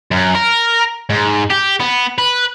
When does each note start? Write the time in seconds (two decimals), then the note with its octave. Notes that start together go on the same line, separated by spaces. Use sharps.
0.11 F#2
0.35 A#4
1.10 G#2
1.50 G4
1.80 B3
2.19 B4